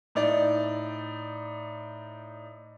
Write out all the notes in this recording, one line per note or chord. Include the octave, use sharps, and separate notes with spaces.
A2 D#4 D5